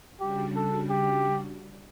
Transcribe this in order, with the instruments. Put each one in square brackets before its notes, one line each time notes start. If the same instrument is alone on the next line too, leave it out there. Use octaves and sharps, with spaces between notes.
[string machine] C#3 G3 D4 F#4 [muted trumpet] G4
[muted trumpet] A4
G4